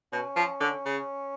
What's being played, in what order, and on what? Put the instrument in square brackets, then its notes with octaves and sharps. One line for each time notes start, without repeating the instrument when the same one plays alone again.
[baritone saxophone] B2 [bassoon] C#4
[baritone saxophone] F3
D3
C#3